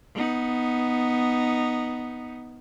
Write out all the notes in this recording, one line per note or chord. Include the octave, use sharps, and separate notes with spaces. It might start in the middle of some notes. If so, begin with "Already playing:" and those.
B3 D#4